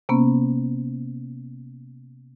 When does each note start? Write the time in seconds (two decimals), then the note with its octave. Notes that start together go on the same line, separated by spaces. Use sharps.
0.09 C3 A#3 B3 C#4